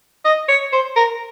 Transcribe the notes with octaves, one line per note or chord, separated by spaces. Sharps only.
D#5
C#5
C5
A#4